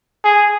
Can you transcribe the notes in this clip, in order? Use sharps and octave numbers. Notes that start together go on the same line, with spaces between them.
G#4